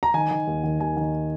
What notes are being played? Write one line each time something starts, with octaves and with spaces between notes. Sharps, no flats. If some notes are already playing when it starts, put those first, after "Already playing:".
A#5
D#3 G#5
D#3
D#2
D#3
D#2 G#5
D#3